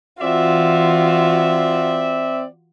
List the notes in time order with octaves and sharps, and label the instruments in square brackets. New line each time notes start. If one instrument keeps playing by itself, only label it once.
[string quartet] E3 F4 F#4 [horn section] C4 D5 E5